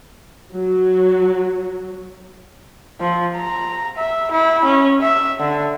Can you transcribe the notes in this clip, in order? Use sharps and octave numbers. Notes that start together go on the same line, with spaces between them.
F#3
F3
A#5
E5
E4
C#4
E5
D3